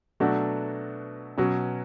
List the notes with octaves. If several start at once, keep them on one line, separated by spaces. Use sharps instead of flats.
B2 F#3 A3 D4 F#4
B2 F#3 C#4